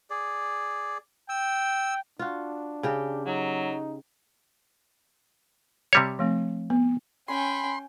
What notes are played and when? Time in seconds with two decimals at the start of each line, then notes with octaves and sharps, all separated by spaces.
0.10 G#4 D5
1.29 G5 E6
2.19 D4 F4 F#4
2.83 C#3 G4 G5
3.26 F#3 D#4
5.93 C3 G3 C#5
6.19 F3 A3 C4
6.70 B3
7.28 C#4 G5 G#5 B5 C6